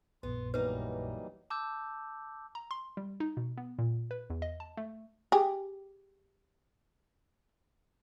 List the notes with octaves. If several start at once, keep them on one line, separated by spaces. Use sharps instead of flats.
A#1 F#2 A#2 B3 C6
E3 F#3 G3 A#3 D#4 B4
A5 D6 E6 G6
A#5
C6
G3
D#4
B2
B3
A#2
B4
E2
D#5
A5
A3
G4 G#4